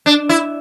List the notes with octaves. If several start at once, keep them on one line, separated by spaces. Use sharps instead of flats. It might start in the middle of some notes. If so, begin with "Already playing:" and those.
D4
E4